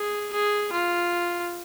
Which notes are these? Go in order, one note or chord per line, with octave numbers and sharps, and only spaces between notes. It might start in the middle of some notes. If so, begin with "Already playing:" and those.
Already playing: G#4
G#4
F4